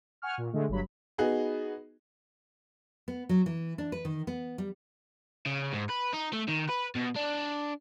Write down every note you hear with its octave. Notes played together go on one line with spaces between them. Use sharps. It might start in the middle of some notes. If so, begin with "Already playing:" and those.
F#5 G#5 C#6 F6
A#2
D3 G#3 A3
G1 G2 F#3 B5
B3 D#4 F#4 G#4
B3
F#3
E3
D4
B4
D#3
B3
G3
C#3
G#2
B4
D#4
A3
D#3
B4
B2
D4